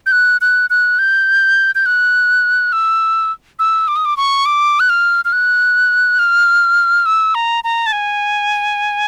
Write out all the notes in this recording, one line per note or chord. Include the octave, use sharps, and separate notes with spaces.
G6
F#6
F#6
F#6
G6
G6
F#6
E6
E6
D6
D#6
D6
C#6
D6
F#6
F6
F6
F#6
F6
E6
A#5
A#5
A5
G#5